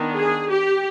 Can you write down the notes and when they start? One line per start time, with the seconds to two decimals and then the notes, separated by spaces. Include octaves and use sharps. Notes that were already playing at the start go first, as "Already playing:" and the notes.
Already playing: D#3 B3 D4
0.15 G#4
0.50 G4